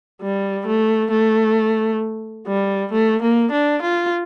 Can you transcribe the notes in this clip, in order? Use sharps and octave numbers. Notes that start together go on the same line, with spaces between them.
G3
A3
A3
G3
A3
A#3
D4
F4